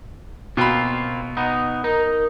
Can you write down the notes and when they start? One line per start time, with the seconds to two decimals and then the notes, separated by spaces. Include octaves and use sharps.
0.57 B2 A#3 C4 F4 B5
1.37 B3 D#4
1.84 D#4 A#4